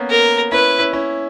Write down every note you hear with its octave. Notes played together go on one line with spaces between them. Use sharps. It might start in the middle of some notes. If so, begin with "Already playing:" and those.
Already playing: A#3 B3 C#4
A#4
C#4 E4 B4
C#4 E4
C#4 E4